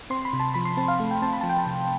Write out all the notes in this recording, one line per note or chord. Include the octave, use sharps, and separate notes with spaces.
C4 C6
B5
C3
A5
F3 B5
C6
C4 A5
F5
A3 F5
G5
C4 A5
B5
F3 A5
G5
A5
C3